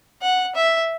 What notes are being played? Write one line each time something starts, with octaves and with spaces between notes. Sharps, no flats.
F#5
E5